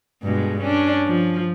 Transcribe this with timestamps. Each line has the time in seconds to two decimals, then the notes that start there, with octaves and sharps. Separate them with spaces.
0.23 G2 B2 G#3
0.63 C#4 D4
1.06 F3